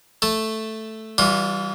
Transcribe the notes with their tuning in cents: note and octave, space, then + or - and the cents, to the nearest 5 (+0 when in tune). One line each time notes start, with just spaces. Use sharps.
A3 +0 A4 +0
E3 -15 G3 -15 F4 +30